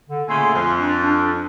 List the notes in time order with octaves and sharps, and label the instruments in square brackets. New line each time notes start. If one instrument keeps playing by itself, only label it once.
[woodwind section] D3
[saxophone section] A#2 C#3 A3 [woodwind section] G#5 C6
[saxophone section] F2
[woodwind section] D4
D4